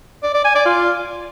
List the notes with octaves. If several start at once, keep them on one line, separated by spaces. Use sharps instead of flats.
D5
D5
G#5
D5
F4